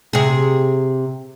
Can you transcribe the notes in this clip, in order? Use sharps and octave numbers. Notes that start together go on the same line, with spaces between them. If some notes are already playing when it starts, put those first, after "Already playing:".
C3 G#4